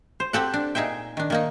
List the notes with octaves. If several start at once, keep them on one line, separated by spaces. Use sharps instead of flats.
C5
C4 G4 A4 F#5
D4
A#2 D#4 G#4 E5 G5
D#3 D4
D#3 A#3 D#4